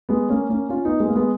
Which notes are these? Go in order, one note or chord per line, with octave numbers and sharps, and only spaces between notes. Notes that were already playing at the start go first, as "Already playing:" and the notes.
G#3 B3
A#3 C#4
A#3 C#4
C#4 F4
B3 D#4
G#3 B3
A#3
G#3 B3